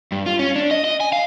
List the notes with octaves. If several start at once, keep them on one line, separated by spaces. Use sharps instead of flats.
G2
F4
C#4
D4
D#5
D#5
G#5
F5